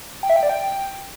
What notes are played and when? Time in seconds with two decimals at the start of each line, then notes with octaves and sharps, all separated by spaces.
0.23 G5
0.30 E5
0.36 G5
0.43 D5
0.49 G5